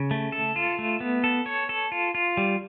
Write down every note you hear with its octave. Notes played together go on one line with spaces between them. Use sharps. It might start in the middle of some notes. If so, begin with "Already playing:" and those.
Already playing: C#3
A3
A4
F4
A3
B3
A4
C#5
A4
F4
F4
G3